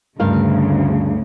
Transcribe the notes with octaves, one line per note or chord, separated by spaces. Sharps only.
D2 G2 C#3 A#4 F5